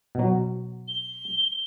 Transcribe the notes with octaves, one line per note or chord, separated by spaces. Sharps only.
B2 F#3
G7